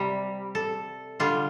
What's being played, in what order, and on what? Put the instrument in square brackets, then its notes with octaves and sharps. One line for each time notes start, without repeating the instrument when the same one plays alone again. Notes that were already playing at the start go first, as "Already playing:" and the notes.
Already playing: [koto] C3 G3
A4
D3 G3 F4